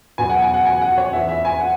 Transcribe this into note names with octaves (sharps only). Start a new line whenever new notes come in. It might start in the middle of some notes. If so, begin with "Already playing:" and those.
E2 B2 F#3 B3 G#5
F#5
G#5
F#5
G#5
F#5
C#5
E2 E3 B3 E5
E5
G#5
F#5